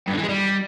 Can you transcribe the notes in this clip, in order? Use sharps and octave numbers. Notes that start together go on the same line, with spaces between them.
G2
D3
E3
G#3
G3